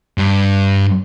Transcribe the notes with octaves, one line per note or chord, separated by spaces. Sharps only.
G2